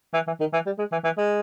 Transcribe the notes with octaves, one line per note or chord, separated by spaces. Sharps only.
E3
E3
D#3
E3
G3
G#3
E3
E3
G#3